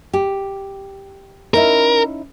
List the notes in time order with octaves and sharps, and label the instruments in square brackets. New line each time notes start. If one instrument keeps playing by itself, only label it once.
[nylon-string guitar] G4
[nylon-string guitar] C#4 D#4 E4 [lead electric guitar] A#4